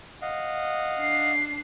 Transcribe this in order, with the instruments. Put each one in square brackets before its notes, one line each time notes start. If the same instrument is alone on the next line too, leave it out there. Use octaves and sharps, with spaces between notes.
[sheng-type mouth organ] D#5 F5 F#5
[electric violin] D4 C7